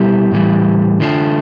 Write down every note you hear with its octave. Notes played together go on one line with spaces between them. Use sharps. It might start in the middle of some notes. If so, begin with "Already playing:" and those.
Already playing: B2 G3 B3 E4 G4
A2 E3 G3
D3 A3 D4 F4